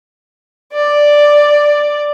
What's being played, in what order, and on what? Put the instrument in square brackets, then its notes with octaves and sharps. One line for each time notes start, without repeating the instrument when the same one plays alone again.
[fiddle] D5